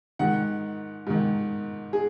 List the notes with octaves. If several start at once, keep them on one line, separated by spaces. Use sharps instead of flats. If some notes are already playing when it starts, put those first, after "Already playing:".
G#2 D#3 F#5
G#2 D#3
G#4